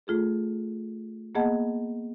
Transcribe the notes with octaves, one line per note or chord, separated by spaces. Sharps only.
A3 F4 G#4 A4
A#3 B3 G#4 D#5 F#5 A5